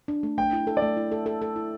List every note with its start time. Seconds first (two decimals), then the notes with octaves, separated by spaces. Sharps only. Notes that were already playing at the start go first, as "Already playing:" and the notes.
0.08 D4
0.23 A3
0.38 A3 G5
0.53 E4
0.67 A4
0.77 D5
0.82 A3
0.97 E4
1.12 A4
1.26 A4
1.42 A4
1.56 E4